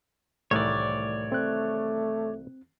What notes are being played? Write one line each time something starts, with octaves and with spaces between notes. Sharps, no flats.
C2 A2 D#3 E3 A3 C#5 D5
A3 C4 F#6